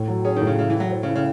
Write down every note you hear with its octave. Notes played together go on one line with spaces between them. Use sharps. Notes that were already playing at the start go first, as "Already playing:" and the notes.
Already playing: A2
F#3
C#4 G#4
D#3
A2
C#3
C#3 E4
E3 E4
F#3
C5
C#3
E4
C#3